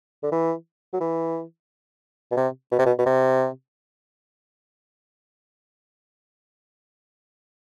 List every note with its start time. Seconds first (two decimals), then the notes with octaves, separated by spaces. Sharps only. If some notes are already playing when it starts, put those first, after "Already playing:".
0.23 D3
0.32 E3
0.93 F#3
1.00 E3
2.31 B2
2.37 C3
2.71 B2
2.79 C3
2.86 B2
2.98 B2
3.06 C3